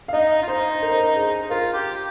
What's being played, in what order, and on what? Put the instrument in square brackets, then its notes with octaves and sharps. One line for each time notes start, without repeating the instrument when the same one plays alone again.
[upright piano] F5
[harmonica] D#4 [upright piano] D#5
[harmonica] F4
[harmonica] D#4 [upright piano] C5
[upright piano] A#4
C5
A#4
G#4
[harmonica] F4 [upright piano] A#4
[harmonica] G4